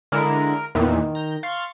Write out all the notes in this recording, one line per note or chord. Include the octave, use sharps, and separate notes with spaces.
D3 G#3 E4 A#4
E2 A#2 D#3 E3
A#5 G6
F5 C6 C#6 A6